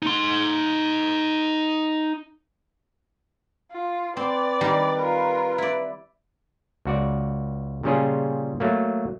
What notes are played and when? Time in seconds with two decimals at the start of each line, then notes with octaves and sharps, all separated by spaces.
0.03 D#4 C6
3.71 F4
4.17 C4 B4 D5
4.61 D#3 G3
4.99 F4 A#4
5.58 E4 D5
6.85 C#2 F#4 D5
7.83 A#2 C#3 G3 C#4 F4 G#4
8.60 F#3 A3 A#3